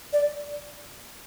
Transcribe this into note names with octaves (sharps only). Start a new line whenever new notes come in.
D5